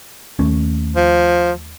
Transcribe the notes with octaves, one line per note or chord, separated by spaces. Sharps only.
D#2 A3 C#4
F3